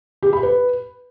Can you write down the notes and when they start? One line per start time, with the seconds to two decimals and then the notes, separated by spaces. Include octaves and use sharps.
0.22 G4
0.33 B5
0.43 B4